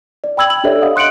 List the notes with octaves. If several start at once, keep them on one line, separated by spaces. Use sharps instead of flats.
D5
G5 B5 E6 G#6 F#7
F#7
D4 G4 A4 C#5 D5 E5
D#5 F5 F#5 D#6
C6 F#6 C#7 D7 F#7